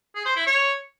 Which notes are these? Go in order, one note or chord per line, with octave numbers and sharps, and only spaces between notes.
G#4
C5
E4
C#5